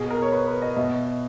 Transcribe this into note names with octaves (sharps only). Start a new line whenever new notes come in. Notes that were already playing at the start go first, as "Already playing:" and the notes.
Already playing: B2 G#4
A#4
C#5
B4
B4
D#5
B2 E5